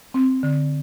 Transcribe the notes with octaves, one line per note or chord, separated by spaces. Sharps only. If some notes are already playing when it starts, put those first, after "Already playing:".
C4
D3